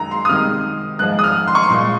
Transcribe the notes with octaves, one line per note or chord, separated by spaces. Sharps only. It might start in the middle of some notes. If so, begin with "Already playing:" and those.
Already playing: F#2 D#3 G#3 A#5
C6
D#6
C3 D#3 G#3 F6
G#2 F3 G#3 F#6
D#6
F6
C6
C#6
C6
A#2 G#3